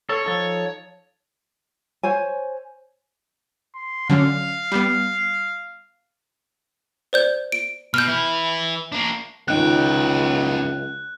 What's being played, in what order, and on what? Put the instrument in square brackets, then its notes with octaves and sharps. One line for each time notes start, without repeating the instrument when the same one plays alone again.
[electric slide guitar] A4 [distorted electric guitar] C#5
[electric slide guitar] F3 D#4 A4
[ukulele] C5 C#5 G#5
[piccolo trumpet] C6
[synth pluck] D3 F#3 C#4 [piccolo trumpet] F5
[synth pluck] G3 B3
[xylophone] C5 D5 G6
D7
[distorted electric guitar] B2 [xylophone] F6 G6
[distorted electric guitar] E3 E4
A#3 D4
[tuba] C#2 [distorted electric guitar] F#2 G5 [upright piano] D#3 D#4 F4 [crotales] F#6